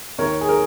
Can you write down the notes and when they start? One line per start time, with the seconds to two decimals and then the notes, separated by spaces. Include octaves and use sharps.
0.18 D#2 A#4 C#5
0.41 G#4
0.49 A#4